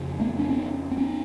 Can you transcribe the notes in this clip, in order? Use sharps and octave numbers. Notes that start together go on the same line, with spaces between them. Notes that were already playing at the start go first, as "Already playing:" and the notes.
Already playing: F2 C#3
A3 B3
C4 D4
B3 C#4
C4
B3 C#4